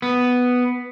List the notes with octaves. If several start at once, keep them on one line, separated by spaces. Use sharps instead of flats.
B3